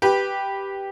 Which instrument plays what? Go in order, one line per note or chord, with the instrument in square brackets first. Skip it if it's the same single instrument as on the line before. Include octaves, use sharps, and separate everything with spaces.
[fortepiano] G4 B4